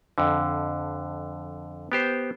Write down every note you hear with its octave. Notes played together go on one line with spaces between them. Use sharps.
F2 D3
B3 G4 C5